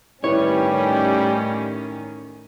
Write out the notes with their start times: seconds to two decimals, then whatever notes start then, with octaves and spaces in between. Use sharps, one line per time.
0.24 A2 D#3 G3 C#4 E4 B4 C#5